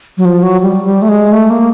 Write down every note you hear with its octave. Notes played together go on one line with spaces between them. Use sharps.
F#3
F3
F#3
G3
G3
A3
G#3
A3
A#3